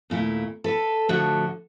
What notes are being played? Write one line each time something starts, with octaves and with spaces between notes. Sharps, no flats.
D#2 A#2 A3 E4
A4 B4
A2 D3 F3 F#4 E5